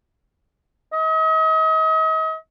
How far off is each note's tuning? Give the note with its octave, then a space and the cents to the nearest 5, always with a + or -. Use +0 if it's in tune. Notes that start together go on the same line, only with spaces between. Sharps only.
D#5 +40